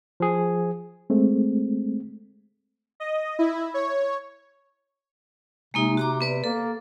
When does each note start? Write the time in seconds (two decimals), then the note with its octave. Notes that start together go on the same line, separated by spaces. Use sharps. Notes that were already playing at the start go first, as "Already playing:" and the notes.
0.20 F3 G#4
1.10 G#3 A3 C4
3.00 D#5
3.39 E4
3.74 C#5
5.74 C3 G#3 A#3 D#4
5.97 F#4 A#5 D6
6.21 B3 B4 D5
6.44 A#3 A4